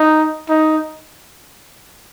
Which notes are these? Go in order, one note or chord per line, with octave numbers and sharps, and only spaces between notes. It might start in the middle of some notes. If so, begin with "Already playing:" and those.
Already playing: D#4
D#4